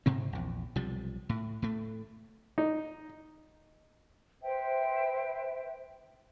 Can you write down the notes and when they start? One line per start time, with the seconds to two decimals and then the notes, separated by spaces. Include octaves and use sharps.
0.06 G#2 C3 C4
0.33 A#1 E2
0.76 B1 C3 F3 G3
1.29 A2
1.62 A2 A3
2.58 D#4
4.42 B4 C5 E5 G5